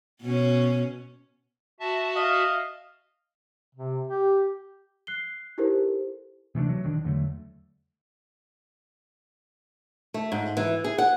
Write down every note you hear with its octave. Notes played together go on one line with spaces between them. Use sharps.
B2 C#4
F#4 E5 A5
D#5 F5
C3
G4
F#6 C7 G7
D#4 E4 G4 A4 A#4 C5
C3 E3 A3 D4
F#3
D#1 D#3 D4
E2 D3 F#3 A3
A3
G#2
E3
G#4
F#5